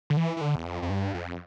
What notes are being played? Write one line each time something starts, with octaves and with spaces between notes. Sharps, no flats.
D3
E3
E3
D3
E2
F2
F2
G2
F2